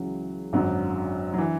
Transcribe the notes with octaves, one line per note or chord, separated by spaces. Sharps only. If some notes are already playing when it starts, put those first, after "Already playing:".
Already playing: C#2 C#3 E3 F#3
G#1 F#2 D3 F#3
F#3
D3 E3